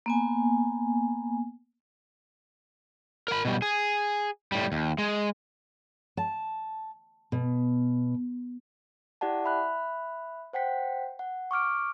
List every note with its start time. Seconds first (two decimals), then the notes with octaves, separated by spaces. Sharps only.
0.06 A#3 B3 G#5
3.28 A#4 B5
3.45 B2 G3
3.62 G#4
4.52 A2 G3
4.72 D#2
4.98 G#3
6.17 A5
7.32 B2
9.21 E4 G4 D5 F#5 A5
9.44 E5 B5 F#6
10.53 C5 F#5 G5 B6
11.19 F#5
11.51 C#6 D6 F6 D7